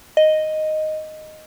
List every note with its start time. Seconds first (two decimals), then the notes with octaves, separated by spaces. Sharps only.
0.17 D#5